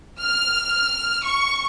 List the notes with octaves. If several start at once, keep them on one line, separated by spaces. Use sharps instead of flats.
F6
C#6